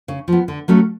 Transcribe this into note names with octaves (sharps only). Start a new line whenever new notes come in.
C#3
F3 B3
D3
F#3 A3 C#4